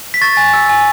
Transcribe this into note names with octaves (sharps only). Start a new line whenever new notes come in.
B6
C#6 A6
G#5
E6
G#5